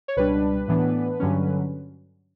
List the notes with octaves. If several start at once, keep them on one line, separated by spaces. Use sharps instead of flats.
C#5
C#2 B2 G3 D4 B4
A2 E3 B3 D4
G2 D3 F#3 C#4